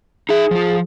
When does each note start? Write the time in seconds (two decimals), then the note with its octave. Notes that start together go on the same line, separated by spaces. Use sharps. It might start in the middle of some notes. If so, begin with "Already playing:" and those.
0.29 D#4 G#4 E5
0.51 F3 F4